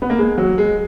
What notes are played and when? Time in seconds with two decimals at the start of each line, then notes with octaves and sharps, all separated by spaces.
0.02 B3
0.10 A#3
0.18 G#3
0.38 F#3
0.58 G#3